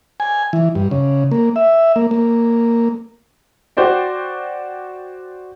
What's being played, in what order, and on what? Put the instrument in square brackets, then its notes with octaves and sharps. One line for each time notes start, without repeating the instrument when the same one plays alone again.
[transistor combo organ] G#5
E3
G2
C#3
A#3
E5
A#3
A#3
[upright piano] F#4 C5 D5 G5